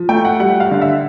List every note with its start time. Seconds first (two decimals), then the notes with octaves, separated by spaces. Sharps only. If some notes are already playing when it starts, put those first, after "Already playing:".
Already playing: F3
0.09 A3 G5
0.25 F#5
0.40 G3 F#5
0.60 F5
0.71 D3
0.82 E5